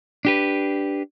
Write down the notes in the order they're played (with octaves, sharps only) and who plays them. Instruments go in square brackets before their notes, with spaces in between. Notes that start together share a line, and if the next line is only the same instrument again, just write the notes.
[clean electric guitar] D4 G4 B4